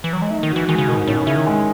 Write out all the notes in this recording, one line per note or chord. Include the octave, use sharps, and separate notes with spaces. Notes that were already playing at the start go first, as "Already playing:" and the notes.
E3
F#3
G#3
A3 D#4
D#3
F#4
E3
D#3 G#3
C#3
B2 D#3
G#2
A2 C#4
B2
C#3 E4
D#3
G#3